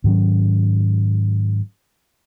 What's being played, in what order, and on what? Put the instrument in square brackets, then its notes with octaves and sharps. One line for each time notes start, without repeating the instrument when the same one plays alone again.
[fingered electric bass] G#2 D#3 F#3 C#4